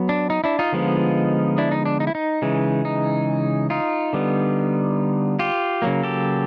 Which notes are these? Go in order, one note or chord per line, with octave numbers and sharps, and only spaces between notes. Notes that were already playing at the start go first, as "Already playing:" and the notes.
Already playing: F#3 B3
D4
D#4
D4 E4
D#4 F4
D3 F3 G#3 B3
D4 E4
D#4
D4
D#4
E4
D#4
C#3 E3 G#3
D#4
D#4 F4
D3 G3 B3
F4 G4
C#3 F#3 A#3
G4 A4